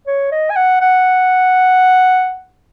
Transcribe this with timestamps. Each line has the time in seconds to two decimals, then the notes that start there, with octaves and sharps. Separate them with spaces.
0.07 C#5
0.32 D#5
0.50 G#5
0.56 F#5
0.81 F#5